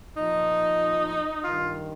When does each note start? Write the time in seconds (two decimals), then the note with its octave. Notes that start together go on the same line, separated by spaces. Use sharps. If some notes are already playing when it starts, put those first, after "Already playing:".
0.17 A#2 F3 D#4
1.44 G2 D#3 F4